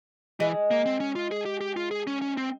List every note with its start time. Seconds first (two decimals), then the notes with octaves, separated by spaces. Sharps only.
0.40 E3 G#3
0.71 A#3
0.86 C4
1.00 C#4
1.15 F4
1.31 G#4
1.46 G4
1.61 G4
1.77 F4
1.91 G#4
2.07 C#4
2.22 C#4
2.37 C4